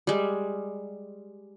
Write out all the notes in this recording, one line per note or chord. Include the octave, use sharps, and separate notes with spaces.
G3 G#3